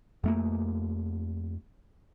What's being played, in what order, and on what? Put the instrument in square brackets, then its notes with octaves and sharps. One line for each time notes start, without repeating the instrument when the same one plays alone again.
[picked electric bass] F2 A3 A#3